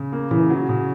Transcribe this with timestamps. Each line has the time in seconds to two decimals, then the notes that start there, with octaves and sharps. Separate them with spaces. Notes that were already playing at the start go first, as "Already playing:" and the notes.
Already playing: C#3
0.12 A#3
0.31 C#3 E3
0.50 F#3
0.69 C#3